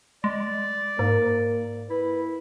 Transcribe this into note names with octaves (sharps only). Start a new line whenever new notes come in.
G#3 D5
G#2 A#3
E4 B4